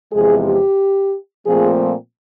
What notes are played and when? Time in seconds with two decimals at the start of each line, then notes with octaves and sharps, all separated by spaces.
0.12 E2 C3 F3 G#3 G#4
0.46 G4
1.46 A#2 F3 A3 C4 G#4